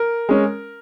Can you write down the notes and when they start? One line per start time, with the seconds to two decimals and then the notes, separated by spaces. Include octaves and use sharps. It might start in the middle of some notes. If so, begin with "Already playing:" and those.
Already playing: A#4
0.29 G#3 C#4